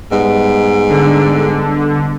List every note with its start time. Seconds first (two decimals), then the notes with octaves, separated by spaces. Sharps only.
0.12 G#2 G3 B3 D#5
0.89 D3